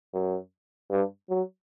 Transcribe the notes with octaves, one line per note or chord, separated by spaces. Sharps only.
F#2
G2
F#3